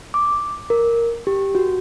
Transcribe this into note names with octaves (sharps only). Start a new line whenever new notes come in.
D6
A#4
G4
F#4